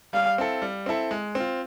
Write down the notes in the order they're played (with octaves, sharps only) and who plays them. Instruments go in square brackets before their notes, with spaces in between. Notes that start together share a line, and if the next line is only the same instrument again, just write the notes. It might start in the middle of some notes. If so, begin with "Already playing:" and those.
[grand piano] G3 [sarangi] F5
[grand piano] C4 E4 A4
G3
C4 E4 A4
G#3
C4
F4